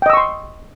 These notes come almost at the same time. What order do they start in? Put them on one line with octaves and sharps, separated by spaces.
G5 D#5 E6 C#6 C6